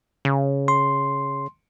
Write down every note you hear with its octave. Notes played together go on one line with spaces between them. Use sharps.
C#3
C6